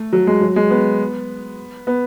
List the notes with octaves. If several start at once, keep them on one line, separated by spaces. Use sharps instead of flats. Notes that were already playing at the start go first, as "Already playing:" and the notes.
Already playing: A3
F#3
G#3
F#3
G#3
B3
B3